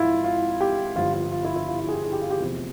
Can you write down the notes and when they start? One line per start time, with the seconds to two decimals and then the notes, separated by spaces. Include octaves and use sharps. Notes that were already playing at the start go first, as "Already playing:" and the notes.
Already playing: G#1 G#2 F3 E4 F4
0.24 F4
0.60 G4
0.96 G1 G2 F3 F4
1.13 F4
1.32 F4
1.45 E4
1.56 E4
1.69 F4
1.80 F4
1.89 G#4
1.92 G4
2.04 G#4
2.12 G4
2.21 F4
2.30 G4
2.39 F1 E2 C3 F3 G#4